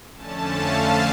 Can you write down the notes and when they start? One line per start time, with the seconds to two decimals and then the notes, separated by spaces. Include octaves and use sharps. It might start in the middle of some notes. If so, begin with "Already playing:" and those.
0.14 F2 D3 A3 C#4 A5
0.51 F5